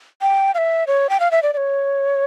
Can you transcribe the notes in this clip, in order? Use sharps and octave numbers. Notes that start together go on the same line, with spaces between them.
G5
F5
E5
C#5
G5
F5
E5
D5
D5
C#5